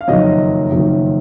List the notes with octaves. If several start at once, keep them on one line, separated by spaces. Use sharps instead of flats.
F5
F#1 F2 D#3 F#3 D#5
F#1 F2 D#3 F#3